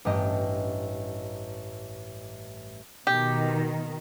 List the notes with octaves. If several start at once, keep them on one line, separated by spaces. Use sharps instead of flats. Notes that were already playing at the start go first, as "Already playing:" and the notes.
A1 G2 G4 D#5
B2 D#3 G4